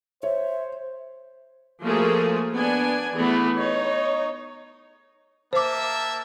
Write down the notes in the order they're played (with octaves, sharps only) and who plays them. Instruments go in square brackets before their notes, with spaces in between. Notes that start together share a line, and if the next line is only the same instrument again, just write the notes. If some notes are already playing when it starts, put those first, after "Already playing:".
[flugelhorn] C5 [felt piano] C#5 [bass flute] E5
[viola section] F3 A3 A#3 F#4 G#4
B3 D4 G#5
E3 A3 B3 G#4
D#4 C#5
[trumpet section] A#3 E5 A5 [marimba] C5 D6